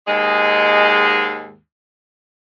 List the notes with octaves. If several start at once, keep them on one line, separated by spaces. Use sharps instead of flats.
D#2 G#2 G#3